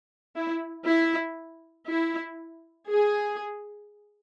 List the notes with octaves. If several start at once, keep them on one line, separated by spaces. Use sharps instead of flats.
E4
E4
E4
G#4